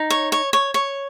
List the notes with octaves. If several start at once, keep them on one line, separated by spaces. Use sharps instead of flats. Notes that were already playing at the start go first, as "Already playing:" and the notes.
Already playing: D#4
C#5
C#5
C#5
C#5